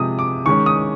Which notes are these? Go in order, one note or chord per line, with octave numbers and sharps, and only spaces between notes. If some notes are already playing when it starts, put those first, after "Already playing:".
Already playing: C3 F3 G#3 D#6
D6
D#3 G#3 C#4 C#6
D#6